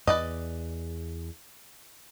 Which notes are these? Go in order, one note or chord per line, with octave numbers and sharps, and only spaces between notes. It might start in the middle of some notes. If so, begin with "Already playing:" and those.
E2 B4 D5 D#5